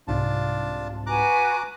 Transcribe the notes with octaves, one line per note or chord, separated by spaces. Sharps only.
C2 G#2 C3 D4 F4 A5
F#4 B4 G#5 A#5 D6 F#6